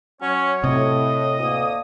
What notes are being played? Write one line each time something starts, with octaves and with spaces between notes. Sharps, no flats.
F#3 C#4 C#5
A2 C3 D#5
D2 A#3 D#6